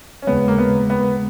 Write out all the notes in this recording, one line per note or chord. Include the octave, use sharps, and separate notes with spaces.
C#4
D#2 C#3 G#3 B3
A#3
B3
B3